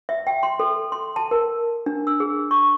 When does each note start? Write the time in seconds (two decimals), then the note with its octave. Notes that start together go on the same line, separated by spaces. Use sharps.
0.09 E5
0.27 G5
0.43 C6
0.60 A4
0.92 C6
1.16 A5
1.31 A#4
1.86 D4
2.07 E6
2.20 G#4
2.51 C#6